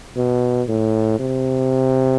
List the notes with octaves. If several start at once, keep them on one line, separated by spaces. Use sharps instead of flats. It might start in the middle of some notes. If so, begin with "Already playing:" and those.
B2
A2
C3